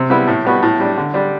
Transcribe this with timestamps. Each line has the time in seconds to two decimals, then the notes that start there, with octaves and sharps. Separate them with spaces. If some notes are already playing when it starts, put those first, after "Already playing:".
Already playing: C3
0.10 G3 B3 E4
0.27 A2
0.45 G3 B3 F#4
0.62 A2
0.80 G3 D4
0.97 D3
1.14 G3 D4